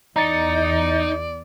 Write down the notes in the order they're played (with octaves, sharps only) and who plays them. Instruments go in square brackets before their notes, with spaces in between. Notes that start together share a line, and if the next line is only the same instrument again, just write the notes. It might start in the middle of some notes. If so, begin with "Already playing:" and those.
[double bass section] E2 [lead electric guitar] D#4 [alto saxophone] D5 [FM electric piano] A#5 A6 C#7